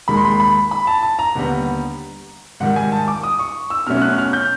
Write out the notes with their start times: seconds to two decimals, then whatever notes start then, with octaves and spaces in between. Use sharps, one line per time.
0.08 D#2 D#3 G#3 B5
0.17 C6
0.25 B5
0.40 B5
0.71 B5
0.87 A5
1.03 A5
1.19 A#5
1.35 D#2 D3 G3 B3
2.60 G#2 D#3 G3 F#5
2.76 G#5
2.92 A5
3.08 D6
3.23 D#6
3.39 C#6
3.70 E6
3.87 B2 F#3 A3 C#4 F6
3.97 F6
4.02 F#6
4.18 F6
4.33 G6